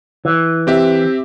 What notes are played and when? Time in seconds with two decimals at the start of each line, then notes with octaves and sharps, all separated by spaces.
0.25 E3
0.67 C4 G4 E5